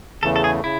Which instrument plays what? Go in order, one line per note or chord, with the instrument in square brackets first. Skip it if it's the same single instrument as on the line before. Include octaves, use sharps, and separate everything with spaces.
[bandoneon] E2 C#3 E3 A3 [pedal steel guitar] A4
[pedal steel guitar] A4
G#4
[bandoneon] C#3 [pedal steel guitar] E4